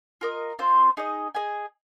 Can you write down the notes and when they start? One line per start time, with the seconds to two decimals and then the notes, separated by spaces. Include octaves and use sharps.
0.21 F4 A#4 D#5
0.59 C4 F4 C5
0.97 D#4 G#4 D#5
1.35 G#4 D#5 G#5